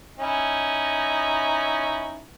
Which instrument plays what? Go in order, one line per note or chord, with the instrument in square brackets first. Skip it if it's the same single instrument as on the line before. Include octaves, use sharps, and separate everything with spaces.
[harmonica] C#4 D#4 E4